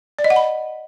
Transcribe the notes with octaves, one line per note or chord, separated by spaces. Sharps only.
D5
D#5
F#5
B5